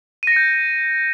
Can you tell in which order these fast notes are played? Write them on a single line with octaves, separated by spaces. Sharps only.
D#7 A#6 C#7 G6